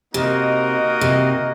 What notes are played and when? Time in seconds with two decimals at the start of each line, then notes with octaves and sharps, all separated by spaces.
0.14 C3 A#3 D#4 F#4 A#4 D#5
1.01 C3